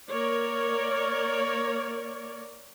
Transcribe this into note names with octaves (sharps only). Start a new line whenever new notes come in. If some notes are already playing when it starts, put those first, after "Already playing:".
A#3 A#4 C#5 D5